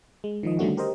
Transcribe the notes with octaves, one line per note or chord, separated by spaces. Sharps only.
G#3
D#3 F3 D#5
D3 D#3 G3 A3 C#4 F#4
G4 A#4 C5 D#5